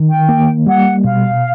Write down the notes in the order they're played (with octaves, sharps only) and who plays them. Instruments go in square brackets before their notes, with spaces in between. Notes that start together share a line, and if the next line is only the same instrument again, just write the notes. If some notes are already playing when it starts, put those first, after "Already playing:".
Already playing: [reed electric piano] D#3
[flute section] G5
[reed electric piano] A#3
[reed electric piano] G3 [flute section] F#5
[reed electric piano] B2 [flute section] F5